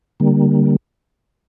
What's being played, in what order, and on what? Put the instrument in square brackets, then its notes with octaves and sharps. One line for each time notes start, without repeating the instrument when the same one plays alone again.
[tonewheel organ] D3 G3 A#3